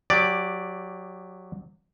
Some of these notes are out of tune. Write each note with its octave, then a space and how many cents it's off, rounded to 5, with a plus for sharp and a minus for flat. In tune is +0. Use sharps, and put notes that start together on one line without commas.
F#3 -15 G4 +10 D5 +0